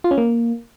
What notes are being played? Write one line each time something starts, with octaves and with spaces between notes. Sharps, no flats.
F4
C#4
A#3